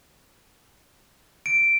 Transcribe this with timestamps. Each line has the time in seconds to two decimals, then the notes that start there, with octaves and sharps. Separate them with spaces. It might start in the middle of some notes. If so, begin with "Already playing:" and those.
1.46 D7